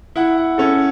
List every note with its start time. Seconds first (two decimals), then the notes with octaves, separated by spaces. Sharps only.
0.16 E4 F#5
0.38 F#5
0.58 C#4 A4